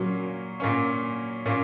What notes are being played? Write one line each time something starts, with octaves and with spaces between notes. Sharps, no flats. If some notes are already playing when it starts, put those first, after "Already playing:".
Already playing: A#2 F#3 A#3 C#4 F#4
A#2 A#3 C#4
A#2 A#3 C#4